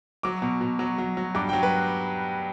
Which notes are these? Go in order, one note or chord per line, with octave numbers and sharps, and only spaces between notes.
F#3 D6
B2
B2
F#3
F#3
F#3
G2 D6
F#3 G5
B4